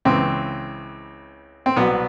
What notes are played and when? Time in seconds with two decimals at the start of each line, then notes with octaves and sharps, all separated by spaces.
0.05 C#2 C#3 E3 C4
1.66 C4
1.76 C2 B2 F#3 B3